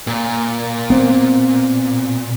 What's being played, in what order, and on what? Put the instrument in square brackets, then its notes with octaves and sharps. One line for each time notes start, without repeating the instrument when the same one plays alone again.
[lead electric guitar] A#2
[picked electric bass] B3 C4